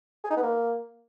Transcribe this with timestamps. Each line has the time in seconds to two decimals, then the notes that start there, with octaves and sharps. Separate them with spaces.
0.24 G#4
0.30 D#4
0.37 B3
0.43 A#3